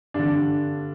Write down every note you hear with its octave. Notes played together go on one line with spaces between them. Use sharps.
G2 D3 D4